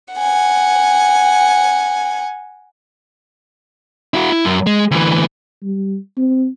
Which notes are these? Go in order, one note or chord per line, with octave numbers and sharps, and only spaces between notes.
F#5 G#5
E4 F#4
E4
F#2
G#3
D2 E3
G3
C4